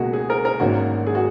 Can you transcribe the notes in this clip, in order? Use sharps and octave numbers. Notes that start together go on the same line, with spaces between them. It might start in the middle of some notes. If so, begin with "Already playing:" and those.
Already playing: C#2 B2 A#3 F#4 G#4
G#4
A#4
A#4
G#1 G#2 D#3 A#3 C#4 F#4
G#4
F#4